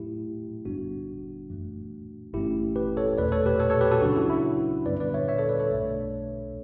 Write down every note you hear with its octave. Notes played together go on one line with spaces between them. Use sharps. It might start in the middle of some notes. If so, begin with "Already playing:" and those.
Already playing: A2 F#3 A3 E4 G4
G1 G2 D3 G3 B3 D4 F#4
F#2 E3 A3
G1 G2 E3 A3 C#4 E4 G4
G4 B4
A4 C#5
E2 B2 A3 B4 D5
A4 C#5
G4 B4
A4 C#5
A4 C#5
G4 B4
F#4 A4
C#2 C#3 F#3 C#4 D4 F#4
E4
E4
G2 D3 G3 B3 D4 B4 D5
B4 D5
C#5 E5
C#5 E5
A4 C#5
B4 D5
A4 C#5
B1 B2 A3 D4